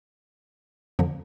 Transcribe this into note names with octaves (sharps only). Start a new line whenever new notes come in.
F2 D3 F3